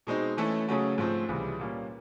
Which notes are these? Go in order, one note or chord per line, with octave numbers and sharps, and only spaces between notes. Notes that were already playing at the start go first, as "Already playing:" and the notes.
B2 G#3 C4 D#4
E3 A3 C#4 E4 A4
C#3 F#3 A3 C#4 F#4
G#2 F3 A3 C4
C#2 C3 E3 G3
A#2 G3 A#3 C#4